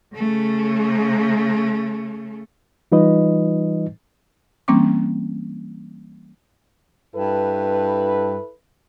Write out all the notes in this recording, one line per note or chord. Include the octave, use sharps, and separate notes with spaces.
C#3 A3
E3 G3 D#4 F4 B4 D#5
E3 G3 A#3 C4 C#4 D6
G2 E4 A4 B4